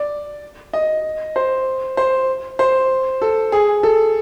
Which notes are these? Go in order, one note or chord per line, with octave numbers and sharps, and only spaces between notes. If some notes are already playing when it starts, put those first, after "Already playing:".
Already playing: D5
D#5
C5
C5
C5
A4
G#4
A4